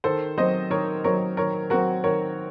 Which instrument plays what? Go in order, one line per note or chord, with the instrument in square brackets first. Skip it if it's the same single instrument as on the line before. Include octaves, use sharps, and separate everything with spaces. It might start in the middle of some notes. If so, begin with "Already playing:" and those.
[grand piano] D#3 [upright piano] A4 C5
[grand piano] F#3 C4 [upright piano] C5 D#5
[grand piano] D#3 [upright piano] A#4 C#5
[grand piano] F#3 C4 [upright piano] A#4 C#5
[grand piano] D#3 [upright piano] A#4 C#5
[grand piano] F#3 C4 [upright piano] F#4 A#4
[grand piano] D#3 [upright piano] A#4 C#5